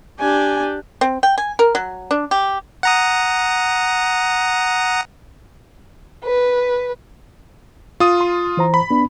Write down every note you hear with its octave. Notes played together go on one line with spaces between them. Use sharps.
D4 G4 G#5
C4
G5
G#5
A#4
F#3
D4
G4
F#5 A#5 D#6
B4
F4 D#6
C6
E3 C5 A#5
B5
B3 D4